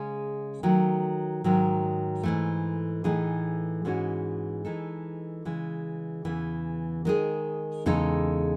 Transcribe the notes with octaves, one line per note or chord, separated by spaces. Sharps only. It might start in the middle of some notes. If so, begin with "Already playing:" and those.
Already playing: C#3 G#3 C#4 G#4
D#3 F#3 A3
G#2 D#3 F#3
G#2 E3 A3
A2 E3 A3 D#4 G#4
G#2 E3 G#3 C#4 F#4
E3 G#3 D#4 A4
C#3 E3 G#3
E2 C#3 E3
D#3 G#3 D#4 G#4
E2 C#3 G#3 D#4 A4